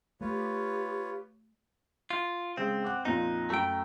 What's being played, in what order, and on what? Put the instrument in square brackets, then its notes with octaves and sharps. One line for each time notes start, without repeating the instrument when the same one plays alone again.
[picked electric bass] A3 [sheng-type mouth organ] F4 B4 C#5 [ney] G4
[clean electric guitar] F4
[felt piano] C#3 G#3 [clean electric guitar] C4
[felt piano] F#5 D6 F#6
[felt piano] F2 A#2 [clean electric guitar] D#4
[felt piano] F#2 A#5 [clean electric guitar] A3 G5